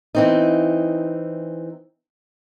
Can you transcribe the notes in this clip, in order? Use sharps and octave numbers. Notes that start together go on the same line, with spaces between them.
E3 C4 D#4